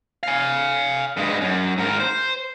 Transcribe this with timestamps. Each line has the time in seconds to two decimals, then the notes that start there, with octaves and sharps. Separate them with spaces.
0.23 F5 G#5
1.17 G2 G#3
1.41 F#2
1.78 G#2 A#4
2.00 C5